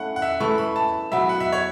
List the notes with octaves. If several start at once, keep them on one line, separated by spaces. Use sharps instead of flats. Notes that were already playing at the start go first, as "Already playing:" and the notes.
Already playing: A3 C#4 E4 F#5
F#5
E5
E3 A3 E4 B4 C#6
B5
A5
F#3 B3 E4 E5
F#5
E5
C#5